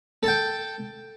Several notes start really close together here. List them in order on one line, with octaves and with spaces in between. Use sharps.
A4 A5 G5